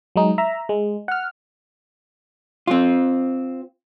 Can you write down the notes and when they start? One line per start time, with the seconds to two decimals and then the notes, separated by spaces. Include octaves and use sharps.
0.16 F#3 G#3 D#4
0.38 E5 A#5
0.69 G#3
1.08 F#5 F6
2.67 C4 F4